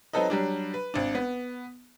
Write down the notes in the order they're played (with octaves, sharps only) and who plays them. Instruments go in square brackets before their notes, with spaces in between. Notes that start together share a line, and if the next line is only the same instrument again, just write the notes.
[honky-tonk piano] F#3 C4 D#4 A4 B4 D#5
F#3 G3 D4
B4
G#1 D4
B3